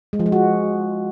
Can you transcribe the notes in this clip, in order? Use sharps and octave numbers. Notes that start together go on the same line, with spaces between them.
G#3
F3
G#3
F#4